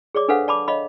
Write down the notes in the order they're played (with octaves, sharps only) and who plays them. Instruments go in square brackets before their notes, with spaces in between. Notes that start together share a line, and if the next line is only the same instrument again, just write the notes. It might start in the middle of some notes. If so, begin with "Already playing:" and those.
[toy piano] G#4 C#5 D5 D6
D4 A4 B4 C5 F5 F#5
D5 A5 B5 D6
C#5 D#5 F5 B5